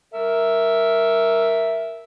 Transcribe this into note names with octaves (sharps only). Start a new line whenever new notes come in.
A#4 E5